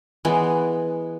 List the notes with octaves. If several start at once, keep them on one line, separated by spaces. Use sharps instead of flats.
E3 G#3 B3